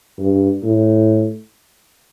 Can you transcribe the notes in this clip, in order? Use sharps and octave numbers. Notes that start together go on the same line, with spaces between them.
G2
A2